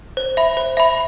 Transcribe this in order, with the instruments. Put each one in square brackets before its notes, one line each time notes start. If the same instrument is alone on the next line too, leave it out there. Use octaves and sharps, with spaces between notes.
[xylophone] C5
E5 B5
C5
E5 B5